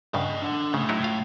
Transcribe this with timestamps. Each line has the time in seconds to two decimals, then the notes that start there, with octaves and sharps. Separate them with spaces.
0.14 G2 C#3 D#5 F#5
0.42 D4 F#5
0.74 A2 C#3
0.89 F#3 D#4 E4
1.03 F4 F5